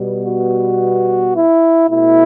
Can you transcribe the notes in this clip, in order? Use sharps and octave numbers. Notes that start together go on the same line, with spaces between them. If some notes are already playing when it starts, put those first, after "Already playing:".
Already playing: B2 G3 B3
F#4
E4
B2 A3 E4